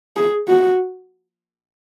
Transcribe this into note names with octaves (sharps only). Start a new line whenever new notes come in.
G#4
F#4